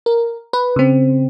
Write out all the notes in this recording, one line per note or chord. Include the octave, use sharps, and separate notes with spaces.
A#4
B4
C#3 C4